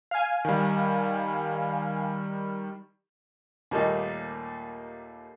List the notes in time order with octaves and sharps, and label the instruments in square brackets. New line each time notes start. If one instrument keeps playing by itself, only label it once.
[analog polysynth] F5 G#5
[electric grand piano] D#3 G3
[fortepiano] D#2 A#2 G3 A3 D#4